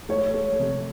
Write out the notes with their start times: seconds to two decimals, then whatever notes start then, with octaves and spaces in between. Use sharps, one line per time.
0.09 A3 C#5
0.34 A3
0.59 C3